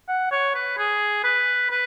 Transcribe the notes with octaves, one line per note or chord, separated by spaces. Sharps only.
F#5
C#5
B4
G#4
B4
B4